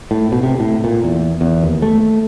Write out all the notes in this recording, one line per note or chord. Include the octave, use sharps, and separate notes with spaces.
A2
B2
C3
A2
A#2
E2
E2
D#2
A3